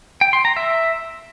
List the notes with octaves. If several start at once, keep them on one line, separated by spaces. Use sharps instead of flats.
G5
C6
A#5
E5